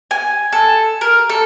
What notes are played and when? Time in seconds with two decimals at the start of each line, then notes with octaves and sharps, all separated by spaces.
0.11 G#5
0.52 A4
1.01 A#4
1.29 A4